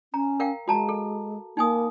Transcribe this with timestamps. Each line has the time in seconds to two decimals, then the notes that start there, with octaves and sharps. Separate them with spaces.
0.14 C#4 A#5
0.40 A#4 F5 G5
0.68 G#3 F#4 A5 A#5
0.89 A4
1.57 A#3 D#4 G#5 D#6